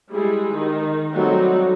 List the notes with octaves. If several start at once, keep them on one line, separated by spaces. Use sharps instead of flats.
G3 G#3 E4 G#4
D#3 D#4
F#3 G3 A3 C4 D#4 F#4